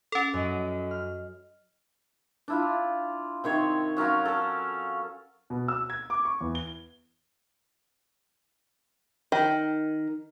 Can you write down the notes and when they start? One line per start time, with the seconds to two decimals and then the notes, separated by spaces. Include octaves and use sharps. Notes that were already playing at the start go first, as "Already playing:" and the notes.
0.12 C#4 A4
0.33 F#2 D#5
0.91 F6
2.48 D4 E4 F4
3.44 C3 D#3 C#5 C6
3.97 F#3 C#4 A#4 F5
4.25 A4 A#4
5.50 B2
5.68 E6
5.90 G#6
6.10 D6
6.25 C#6
6.41 E2
6.55 G7
9.32 D#3